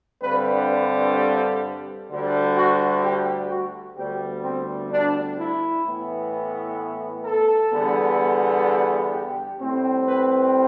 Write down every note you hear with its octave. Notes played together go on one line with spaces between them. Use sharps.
G2 D3 G3 C4 B4
B4
A4
D2 D3 G3
F#4
G4
F#4
D2 D3 G3 B3 G4
C4
D4
E4
A2 E3 B3
A4
E2 D3 G3 B3
G4
A2 G3 C4
B4